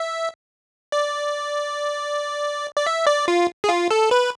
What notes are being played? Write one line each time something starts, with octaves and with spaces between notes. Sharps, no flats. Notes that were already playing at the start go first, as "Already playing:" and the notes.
Already playing: E5
D5
D5
E5
D5
F4
G#4
F4
A4
B4